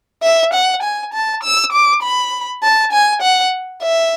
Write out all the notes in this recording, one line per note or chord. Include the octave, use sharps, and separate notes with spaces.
E5
F#5
G#5
A5
E6
D6
B5
A5
G#5
F#5
E5